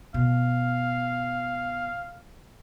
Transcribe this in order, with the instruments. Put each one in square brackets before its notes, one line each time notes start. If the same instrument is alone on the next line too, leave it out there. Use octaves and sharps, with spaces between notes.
[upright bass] B2 [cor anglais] F5